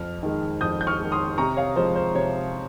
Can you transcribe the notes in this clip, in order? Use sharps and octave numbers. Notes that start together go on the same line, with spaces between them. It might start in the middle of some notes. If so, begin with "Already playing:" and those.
Already playing: F2 F6
D#3 G#3
F2 D#6 G6
G6
C#6 F6
D#3 G#3
C6 D#6
C3 A#5 C#6
C#5 F5
F3 G#3 C5
C5
C3 C#5